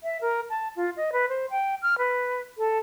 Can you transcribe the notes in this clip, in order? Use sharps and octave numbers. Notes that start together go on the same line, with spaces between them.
E5
A#4
A5
F4
D#5
B4
C5
G5
F6
B4
A4